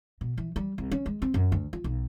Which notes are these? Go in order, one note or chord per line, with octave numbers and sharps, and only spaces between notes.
B2
E3
G3
C2
C#4
G#3
C4
F#2
D2
F4
B1